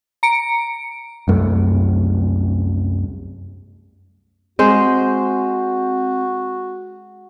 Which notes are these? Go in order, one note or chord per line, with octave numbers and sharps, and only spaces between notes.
A#5 C#7 D7
C2 F#2 A3
G#3 C4 F#4 C5